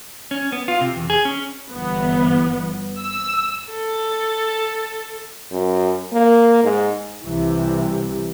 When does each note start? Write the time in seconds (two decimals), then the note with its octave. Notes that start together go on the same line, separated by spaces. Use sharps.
0.31 C#4
0.52 B3
0.68 F4
0.81 C3
0.96 E2
1.10 G#4
1.25 C#4
1.71 G1 E3 B3
2.99 E6
3.72 A4
5.52 F#2
6.13 A#3
6.64 G#2
7.23 C2 C3 E3